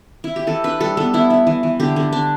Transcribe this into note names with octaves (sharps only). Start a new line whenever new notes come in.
E4
G4
E3 A4
D4 B4
G3 A4
B3 A4
B3 E4
E4
E3
E3
D3 G4
D3
D4